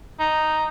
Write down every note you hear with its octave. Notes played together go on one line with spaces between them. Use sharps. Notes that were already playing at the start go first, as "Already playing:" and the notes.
D#4